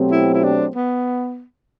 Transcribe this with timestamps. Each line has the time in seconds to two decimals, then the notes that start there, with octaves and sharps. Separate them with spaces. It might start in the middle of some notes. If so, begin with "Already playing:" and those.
Already playing: B2 F#3 A3 C4 G4
0.11 E4
0.34 E4
0.43 D4
0.76 B3